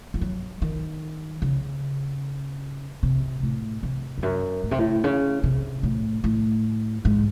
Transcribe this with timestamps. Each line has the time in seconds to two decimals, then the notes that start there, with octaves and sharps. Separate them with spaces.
0.14 E3
0.21 F#3
0.62 D#3
1.42 C#3
3.03 C3
3.43 A2
3.83 C3
4.18 E2
4.23 F#2
4.63 A2
4.71 C3
4.79 A2
5.04 C#3
5.43 C3
5.83 A2
6.24 A2
7.05 G#2